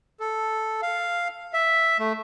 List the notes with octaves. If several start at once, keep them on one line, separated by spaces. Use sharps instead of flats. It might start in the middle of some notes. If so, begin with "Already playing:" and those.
A4
F5
E5
A3